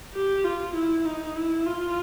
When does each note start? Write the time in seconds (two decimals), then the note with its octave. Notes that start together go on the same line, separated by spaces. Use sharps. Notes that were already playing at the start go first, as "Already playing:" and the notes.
0.14 G4
0.44 F4
0.75 E4
1.06 D#4
1.36 E4
1.66 F4